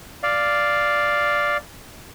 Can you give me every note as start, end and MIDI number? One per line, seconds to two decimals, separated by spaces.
0.23 1.57 74
0.23 1.57 77